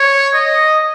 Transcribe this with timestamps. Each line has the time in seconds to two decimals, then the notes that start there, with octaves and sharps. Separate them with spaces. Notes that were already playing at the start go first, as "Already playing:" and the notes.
Already playing: C#5
0.34 D#5